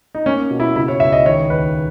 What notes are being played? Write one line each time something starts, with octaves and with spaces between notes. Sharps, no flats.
D#4
A#3 C#4
B2
E4
C#3 E4
C#5
C#2 E5
D#5
D#3 C#5
D#2 B4